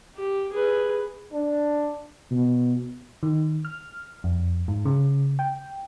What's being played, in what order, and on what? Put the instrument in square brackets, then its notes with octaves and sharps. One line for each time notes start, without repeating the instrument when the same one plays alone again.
[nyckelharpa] G4
G#4 B4
[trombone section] D4
[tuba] B2
[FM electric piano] D#3
F6
F2
G#2
C#3
G5